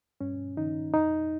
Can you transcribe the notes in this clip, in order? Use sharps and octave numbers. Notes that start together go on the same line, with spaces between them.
G2 C#4
D#3 D#4
F2 D#4